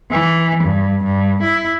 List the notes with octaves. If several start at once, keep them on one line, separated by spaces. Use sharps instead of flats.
E3
G2
G2
E4